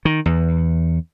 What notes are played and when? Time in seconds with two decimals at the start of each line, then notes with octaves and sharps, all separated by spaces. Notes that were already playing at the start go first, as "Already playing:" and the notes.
0.05 D#3
0.26 E2